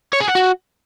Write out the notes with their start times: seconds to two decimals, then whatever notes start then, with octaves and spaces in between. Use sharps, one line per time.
0.13 C#5
0.20 G#4
0.28 F#5
0.35 F#4